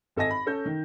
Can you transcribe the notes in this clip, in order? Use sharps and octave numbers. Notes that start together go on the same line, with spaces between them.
G#1 A4 D#5 G#5 A#6
B5
C#4 A4 G6
D#3